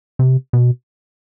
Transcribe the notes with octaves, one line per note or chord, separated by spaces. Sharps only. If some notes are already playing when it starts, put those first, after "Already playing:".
C3
B2